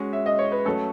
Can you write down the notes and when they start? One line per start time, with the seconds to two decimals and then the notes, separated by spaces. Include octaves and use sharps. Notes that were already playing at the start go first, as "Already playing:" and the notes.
Already playing: G#3 C#4 F#4
0.13 E5
0.26 D#5
0.39 C#5
0.52 B4
0.65 F#3 A3 C#4 A4